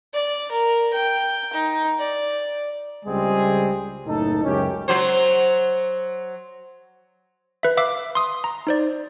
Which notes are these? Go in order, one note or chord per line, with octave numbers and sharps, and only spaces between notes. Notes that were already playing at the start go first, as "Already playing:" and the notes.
D5
A#4
G5
D#4
D5
C#2 G3 G#3 C4 G#4
F#1 A2 D#4 A4
C#2 F#2 C#4 G4
F#3 C5
B4 E5
E5 F5 D6 E6
C6 D#6
A#5
D#4 C5 D5